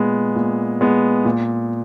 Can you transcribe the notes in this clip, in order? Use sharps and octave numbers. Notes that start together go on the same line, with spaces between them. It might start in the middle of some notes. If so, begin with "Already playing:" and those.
Already playing: A#2 G#3 B3
A#2
G#3 B3
A#2